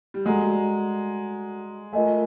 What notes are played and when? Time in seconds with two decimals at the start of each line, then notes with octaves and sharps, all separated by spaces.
0.14 G3
0.25 G#3 F#4 A4 D5 F#5 A#5
1.93 A3 F4 A#4 D#5 G#5